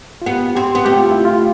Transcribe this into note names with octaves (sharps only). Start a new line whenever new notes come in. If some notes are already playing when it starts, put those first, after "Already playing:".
F4
B3 G4
C4 G4
B3
A3 G4
F4
E4
F4